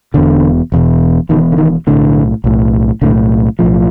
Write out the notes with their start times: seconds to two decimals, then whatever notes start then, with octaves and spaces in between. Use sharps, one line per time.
0.14 E1 E2 B2 D3
0.72 E1 E2 B2
1.29 E1 E2 B2 D#3
1.52 D3
1.58 D#3
1.87 B1 A2 D3
2.44 B1 A2
3.02 B1 A2 D3
3.59 B1 A2 F3